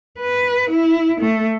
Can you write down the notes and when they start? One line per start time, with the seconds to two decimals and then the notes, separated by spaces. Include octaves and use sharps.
0.20 B4
0.70 E4
1.21 A3